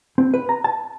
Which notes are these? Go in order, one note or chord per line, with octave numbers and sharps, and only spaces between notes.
C4
B4
A#5
A5